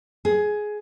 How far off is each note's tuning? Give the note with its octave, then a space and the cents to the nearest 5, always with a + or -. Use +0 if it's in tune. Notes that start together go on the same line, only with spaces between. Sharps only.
G#4 +15